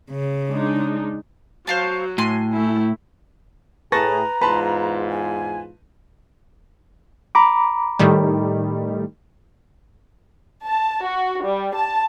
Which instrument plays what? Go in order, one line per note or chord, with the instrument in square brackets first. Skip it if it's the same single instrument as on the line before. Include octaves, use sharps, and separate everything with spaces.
[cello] C#3
[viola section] G#3 D4 D#4
[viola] F#3 [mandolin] C5 F5 A5
[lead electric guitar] A2 [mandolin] G#5 C6
[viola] A3 E4
[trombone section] A2 G#4 [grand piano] B4 A6 A#6 [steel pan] A5 C#6 [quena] A#5
[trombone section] E2 G#2 F4 [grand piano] B4 A5 C6 [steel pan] B5
[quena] G#5
[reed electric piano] A#5 B5 D6
[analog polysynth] A2 D#3 G3
[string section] A5
F#4
G3
A5